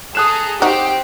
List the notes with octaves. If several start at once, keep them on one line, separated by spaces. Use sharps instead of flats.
G#4 A4 A#5 D#6 F#6 E7
C4 D#4 F#4 G4 G5